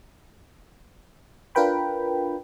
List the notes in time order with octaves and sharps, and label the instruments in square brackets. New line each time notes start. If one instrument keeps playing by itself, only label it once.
[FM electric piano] D4 F4 A#4 B4 G5 B5